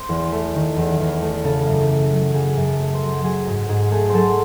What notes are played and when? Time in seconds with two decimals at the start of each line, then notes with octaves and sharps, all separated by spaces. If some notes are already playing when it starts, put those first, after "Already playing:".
Already playing: C5
0.09 E2
0.32 A3
0.55 D#3
0.77 E2
1.00 E2
1.22 A3
1.44 C#3 A4
1.67 F#2
1.89 A3
2.12 F#3
2.34 C#3 G#4
2.57 F#2
2.64 A4
2.79 A3
2.94 C5
3.02 F#3
3.24 F#3 G#4
3.46 G#2 F#4
3.69 G#2 G#4
3.92 A3 G#4
4.09 F#3 A4 C5